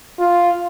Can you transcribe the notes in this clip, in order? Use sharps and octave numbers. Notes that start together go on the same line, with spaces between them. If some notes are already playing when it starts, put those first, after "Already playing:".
F4